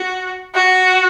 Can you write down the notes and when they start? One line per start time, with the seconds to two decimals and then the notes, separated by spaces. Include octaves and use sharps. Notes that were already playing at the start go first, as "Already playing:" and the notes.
Already playing: F#4
0.55 F#4